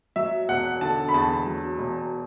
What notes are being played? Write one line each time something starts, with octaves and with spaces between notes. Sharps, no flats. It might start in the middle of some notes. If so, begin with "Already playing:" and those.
F#3 E5
E1 F#5
D3 A5
B5
E2 A5
F#3
E1